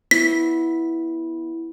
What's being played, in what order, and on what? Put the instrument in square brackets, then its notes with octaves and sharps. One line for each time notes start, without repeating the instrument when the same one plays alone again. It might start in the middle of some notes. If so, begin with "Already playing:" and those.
[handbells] B3 E4 [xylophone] B6